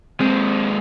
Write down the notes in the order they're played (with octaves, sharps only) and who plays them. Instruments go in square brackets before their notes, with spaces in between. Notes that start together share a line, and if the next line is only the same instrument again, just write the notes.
[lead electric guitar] G#3 A#3 [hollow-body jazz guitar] C4